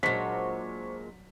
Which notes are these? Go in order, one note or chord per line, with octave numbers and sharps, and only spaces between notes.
A#2 F#3 G#3 D4 C5 C#6 B6